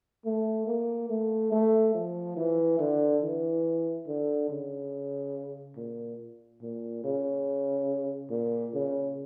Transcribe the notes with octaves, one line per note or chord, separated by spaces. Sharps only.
A3
A#3
A3
A3
F3
E3
D3
E3
D3
C#3
A#2
A#2
C#3
A#2
C#3